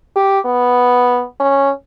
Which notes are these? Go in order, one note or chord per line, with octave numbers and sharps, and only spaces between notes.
G4
B3
C#4